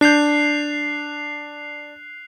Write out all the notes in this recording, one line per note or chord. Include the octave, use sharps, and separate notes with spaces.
D4 F#6 G6 C7 F7